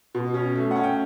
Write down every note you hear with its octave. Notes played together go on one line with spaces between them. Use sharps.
B2
C#4
A3
C#4 F#5
G5